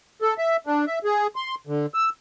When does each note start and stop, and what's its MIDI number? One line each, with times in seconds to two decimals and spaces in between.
0.22 0.34 69
0.38 0.57 76
0.67 0.85 62
0.87 0.99 76
1.04 1.27 68
1.36 1.55 84
1.67 1.86 50
1.94 2.09 88